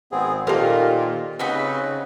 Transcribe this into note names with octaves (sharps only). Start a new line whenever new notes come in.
G#1 B3 C4 G#4
A#2 D#3 A#3 F4 G4 A4 A#4 C5
C#3 C4 D#4 F#4 B4 D#5 B5